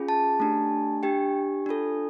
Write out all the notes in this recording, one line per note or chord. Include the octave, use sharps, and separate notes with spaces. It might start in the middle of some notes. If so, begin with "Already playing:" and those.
Already playing: C#4 F4 G#4
A5
A3 D4 G4
D4 G4 G5
D4 F4 A4